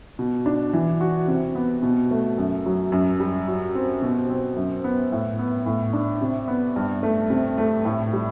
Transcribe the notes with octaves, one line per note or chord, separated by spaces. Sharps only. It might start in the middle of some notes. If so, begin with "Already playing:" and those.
B2
D4
E3
F#4
C3
B3
B2
A3
F#2
F#3
F#2
G3
F#3
C4
B2
C4
F#2
B3
A2
B3
A2
D4
C3
B3
G2
A3
C3
A3
A2
G3